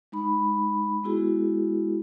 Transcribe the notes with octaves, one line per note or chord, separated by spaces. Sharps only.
G#3 D#4 B5
G#3 B3 E4 F#4 G#4